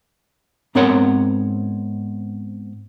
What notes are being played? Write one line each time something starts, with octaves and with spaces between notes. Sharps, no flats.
G#2 B3 C4 A#4 C#5 F#5